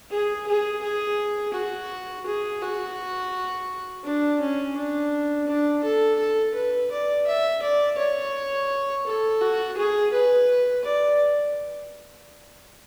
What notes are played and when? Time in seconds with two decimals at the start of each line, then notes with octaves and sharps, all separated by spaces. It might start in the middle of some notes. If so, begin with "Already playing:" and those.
0.11 G#4
0.47 G#4
0.83 G#4
1.54 F#4
2.26 G#4
2.62 F#4
4.04 D4
4.41 C#4
4.76 D4
5.47 D4
5.84 A4
6.19 A4
6.55 B4
6.92 D5
7.28 E5
7.62 D5
7.98 C#5
9.07 A4
9.41 F#4
9.78 G#4
10.13 B4
10.85 D5